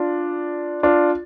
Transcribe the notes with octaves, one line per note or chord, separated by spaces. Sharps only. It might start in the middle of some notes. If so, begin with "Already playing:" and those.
Already playing: D4 F4
D4 F4